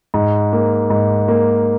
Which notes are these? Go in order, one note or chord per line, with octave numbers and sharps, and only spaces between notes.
G#2
A#3
G#2
A#3